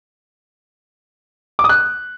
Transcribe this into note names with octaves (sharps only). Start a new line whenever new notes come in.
D6
D#6
F#6